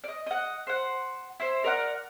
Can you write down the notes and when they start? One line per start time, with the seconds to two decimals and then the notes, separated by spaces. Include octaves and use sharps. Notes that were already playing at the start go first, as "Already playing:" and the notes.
0.04 D5 D#5
0.26 D#5 F#5
0.67 C5 F#5
1.40 E4 C5
1.64 A#4 D5 E5 F#5